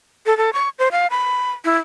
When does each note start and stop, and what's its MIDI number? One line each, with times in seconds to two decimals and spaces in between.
0.26 0.37 69
0.37 0.50 69
0.53 0.69 85
0.79 0.88 72
0.92 1.07 77
1.10 1.51 83
1.65 1.77 64